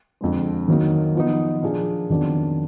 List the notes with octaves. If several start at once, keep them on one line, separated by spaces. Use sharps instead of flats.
F2 D3 G#3
D#3 F#3 A#3 D#4
F3 B3 D#4
A#2 F3 A#3 D4 G#4
F2 D#3 F#3 B3 D4